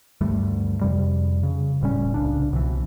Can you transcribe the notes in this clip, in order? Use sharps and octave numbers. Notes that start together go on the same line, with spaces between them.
D2 G2 G3 A3
F2 C3 G3
C#3
D#1 A2 G3 C#4
C2 C#3 D4
C2 B2 E3